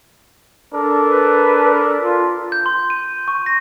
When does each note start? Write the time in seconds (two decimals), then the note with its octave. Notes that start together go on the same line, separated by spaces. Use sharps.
0.74 D4 A4 A#4
1.07 B4
1.99 F4
2.52 G6
2.66 C6
2.90 D#7
3.28 C#6
3.46 A#6